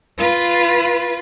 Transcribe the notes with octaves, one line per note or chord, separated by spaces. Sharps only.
F4 B4